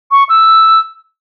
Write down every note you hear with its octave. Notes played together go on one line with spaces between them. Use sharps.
C#6
E6